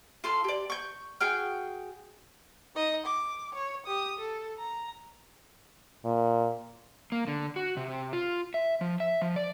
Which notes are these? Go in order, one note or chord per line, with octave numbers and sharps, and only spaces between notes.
F4 A4 C6 F6
G4 D5
C#6 G6
F#4 G#4 G5 F6
D#4 D#5
D6
C#5
G4 D#6
A4
A#5
A#2
A#3
D3
F#4
C3
F4
E5
F3
E5
F3
D5